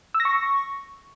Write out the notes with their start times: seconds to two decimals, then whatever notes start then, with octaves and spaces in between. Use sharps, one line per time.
0.14 E6
0.20 A#6
0.25 C#6